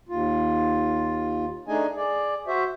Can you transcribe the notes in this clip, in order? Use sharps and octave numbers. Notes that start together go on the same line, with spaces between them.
D#2 F4
A3 D4 D#4 G#4 D#5 G#5
G#4 D5
F#4 C5 E5